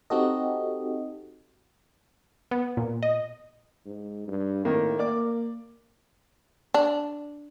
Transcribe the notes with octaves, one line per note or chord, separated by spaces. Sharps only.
C4 D#4 F#4 G4 A4 D#5
B3
A#2
D#5
G#2
G2
A2 D#3 A#3
A#3 D5 D6
D4